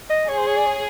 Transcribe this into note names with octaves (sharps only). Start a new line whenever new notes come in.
D#5
G#4 C#5
C5
C#5
D5
C#5